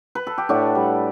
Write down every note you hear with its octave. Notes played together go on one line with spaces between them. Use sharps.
B4
A4
G4
A2 D4 F#4
G3